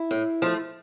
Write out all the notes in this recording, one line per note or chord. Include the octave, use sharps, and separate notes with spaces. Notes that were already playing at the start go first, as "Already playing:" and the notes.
Already playing: E4
A2
F3 A3